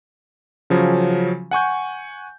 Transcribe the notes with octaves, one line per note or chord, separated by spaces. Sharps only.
C#3 F3 F#3 C#4
F#5 G#5 C#6 G6